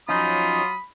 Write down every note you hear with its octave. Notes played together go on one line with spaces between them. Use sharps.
F3 F#3 C#4 D#4 F4 B5 D#6